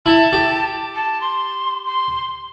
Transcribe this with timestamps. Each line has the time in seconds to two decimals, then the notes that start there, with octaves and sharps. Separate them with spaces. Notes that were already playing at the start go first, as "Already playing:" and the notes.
0.06 E4 A5
0.33 G4
0.95 A5
1.21 C6
1.86 C6